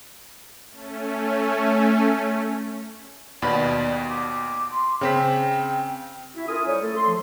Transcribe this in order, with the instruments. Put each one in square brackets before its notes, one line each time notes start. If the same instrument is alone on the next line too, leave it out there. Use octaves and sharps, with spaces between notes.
[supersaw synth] A3 C#4
[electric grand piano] D#2 B2 B5 [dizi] D5
[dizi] D6
C6
[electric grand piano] C#3 C4 B6 [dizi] G5
[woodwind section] E4 F#4 E5
C#4 F4 A4 A#4 D#6
G3 E4 C5 C#5
A3 A4
C6
F3